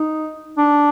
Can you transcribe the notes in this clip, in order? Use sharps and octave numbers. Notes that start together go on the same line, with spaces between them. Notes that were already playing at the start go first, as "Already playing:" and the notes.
Already playing: D#4
D4